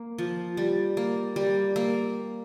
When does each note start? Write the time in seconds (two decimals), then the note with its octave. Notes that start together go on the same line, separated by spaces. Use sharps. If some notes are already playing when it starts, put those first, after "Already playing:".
Already playing: A#3
0.18 F3
0.57 G3
0.97 A#3
1.36 G3
1.76 A#3